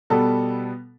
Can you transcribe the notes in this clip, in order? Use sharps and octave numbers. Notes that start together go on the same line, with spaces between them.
B2 G3 B3 A4